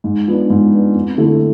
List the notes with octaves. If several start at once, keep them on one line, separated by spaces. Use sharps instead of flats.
G#2
F3 B3 D4
G#2
F3 B3 D4
F2
D3 A3 E4